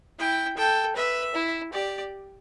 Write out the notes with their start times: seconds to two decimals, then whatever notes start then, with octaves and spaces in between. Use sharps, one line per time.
0.19 E4 G5
0.57 A4 G5
0.96 B4 E5
1.35 E4
1.73 G4 D5